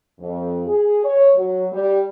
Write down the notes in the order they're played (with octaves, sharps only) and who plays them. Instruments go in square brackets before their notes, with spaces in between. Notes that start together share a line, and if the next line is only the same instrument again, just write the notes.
[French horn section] F2
G#4
C#5
F#3
G3